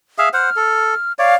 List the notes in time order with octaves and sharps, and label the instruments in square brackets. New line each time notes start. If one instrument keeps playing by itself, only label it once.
[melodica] G#4 E5 F5
[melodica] C5 F#5 [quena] F6
[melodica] A4
[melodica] C#5 D5 [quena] F5